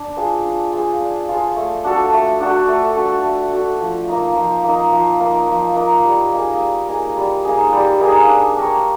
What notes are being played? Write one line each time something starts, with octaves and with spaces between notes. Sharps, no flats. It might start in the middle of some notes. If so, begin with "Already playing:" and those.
Already playing: D4
F4 G#4 C5
D4
F4 G#4 C5
D4
F4 G#4 C5
A3
D4 F#4 A4
A3
D4 F#4 A4
A3
D4 F#4 A4
A3
D4 F#4 A4
F3
A#3 D#4
F3
A#3 D#4
F3
A#3 D#4
F3
A#3 D#4
G3
A#3 D#4 G#4
G3
A#3 D#4 G#4
G3
A#3 D#4 G#4
G3
A#3 D#4 G#4
D4
G4 A#4 C#5